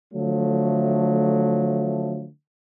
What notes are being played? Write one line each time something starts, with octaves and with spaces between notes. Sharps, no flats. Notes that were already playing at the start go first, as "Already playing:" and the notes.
D3 F3 F#3 A3